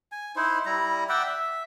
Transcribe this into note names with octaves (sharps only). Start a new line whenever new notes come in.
G#5
D#4 E4 C5
G3 E4 A#5
D5 E5 F#5 G5
E5